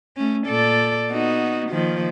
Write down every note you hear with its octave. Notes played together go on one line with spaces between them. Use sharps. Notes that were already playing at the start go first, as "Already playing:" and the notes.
A3 C#4
A#2 A4 D5
B3 D#4 F#4
D#3 F3 A#3